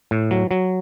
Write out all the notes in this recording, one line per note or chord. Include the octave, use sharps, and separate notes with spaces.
A2
F#3
F#3